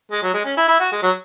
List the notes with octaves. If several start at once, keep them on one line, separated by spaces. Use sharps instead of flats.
G#3
F#3
G#3
C#4
E4
E4
F#4
G#3
F#3